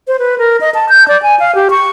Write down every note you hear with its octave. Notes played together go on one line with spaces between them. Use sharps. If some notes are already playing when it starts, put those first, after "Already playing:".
C5
B4
A#4
D#5
A5
G6
D5
G#5
F5
G4
C#6